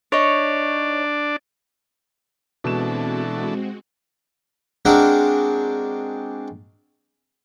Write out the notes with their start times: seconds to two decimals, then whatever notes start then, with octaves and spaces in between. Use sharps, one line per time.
0.12 D4 D#4 C#5 D5
2.64 B2 E3 G#3 C4 D4 F#4 A4 E7
4.85 G#3 C4 D4 F#4 A#4